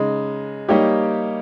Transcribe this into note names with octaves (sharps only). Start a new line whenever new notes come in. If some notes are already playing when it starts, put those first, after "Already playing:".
Already playing: C#3 G#3 D#4
G3 A#3 D#4 G4 C#5